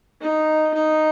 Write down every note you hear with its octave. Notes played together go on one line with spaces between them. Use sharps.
D#4
D#4